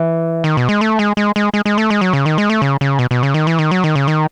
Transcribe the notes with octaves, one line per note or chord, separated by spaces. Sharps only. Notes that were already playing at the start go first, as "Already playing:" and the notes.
Already playing: E3
D#3
B2
G#3
A3
G#3
G#3
G#3
G#3
G#3
A3
G#3
F#3
C#3
D#3
G#3
A3
C#3
C#3
B2
B2
C#3
D#3
E3
D#3
F#3
D#3
C#3
D#3